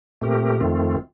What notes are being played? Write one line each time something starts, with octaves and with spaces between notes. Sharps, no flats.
A#2 A3 C4 G4 A#4
F2 D#3 A3 C4 F4